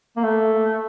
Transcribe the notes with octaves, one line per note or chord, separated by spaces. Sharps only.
A#3
A3